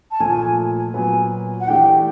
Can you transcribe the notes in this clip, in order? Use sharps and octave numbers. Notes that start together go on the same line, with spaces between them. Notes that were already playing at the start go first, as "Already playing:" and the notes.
A5
A#2 F3 A3 G#5
A#2 F#3 B3 G#5
F#5
E3 A3 D4 G4 B4 G5